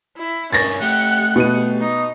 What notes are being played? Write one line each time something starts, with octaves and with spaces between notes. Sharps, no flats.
E4
G2 C#4 D4 A#4 A6 A#6
A3 G4 F#5
B2 D#7
D#4